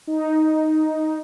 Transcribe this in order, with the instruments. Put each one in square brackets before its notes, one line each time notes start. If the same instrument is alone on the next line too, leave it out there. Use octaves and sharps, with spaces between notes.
[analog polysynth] D#4